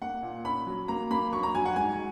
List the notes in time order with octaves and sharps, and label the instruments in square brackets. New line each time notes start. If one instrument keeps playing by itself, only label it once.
[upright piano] A#3 F#5
A#2
C#4 B5
F#3
A#3 A#5
A#3 B5
F#3 C#6
A#5
F#3 G#5
F#5
G#2 G#5